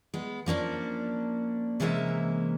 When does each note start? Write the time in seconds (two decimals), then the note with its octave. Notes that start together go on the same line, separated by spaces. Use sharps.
0.14 G#3 B3
0.46 F3 A#3 C#4 D4
1.80 C3 E3 G#3 A#3 C#4 E5